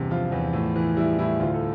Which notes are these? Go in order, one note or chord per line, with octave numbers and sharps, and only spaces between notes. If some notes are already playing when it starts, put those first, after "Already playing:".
Already playing: E2 G2 C3 G4
F3 F4
E2
A2
E3
G3 E4
A2 E4
D2 F4
A4